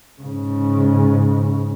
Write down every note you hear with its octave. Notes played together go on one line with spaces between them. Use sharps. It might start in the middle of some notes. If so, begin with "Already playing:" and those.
G#2 C#3